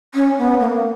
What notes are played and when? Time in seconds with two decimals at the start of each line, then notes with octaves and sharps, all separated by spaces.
0.14 C#4
0.38 B3
0.60 A#3